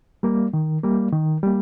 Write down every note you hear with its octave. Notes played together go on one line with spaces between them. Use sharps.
G3 A#3
D#3
G3 A#3
D#3
G3 A#3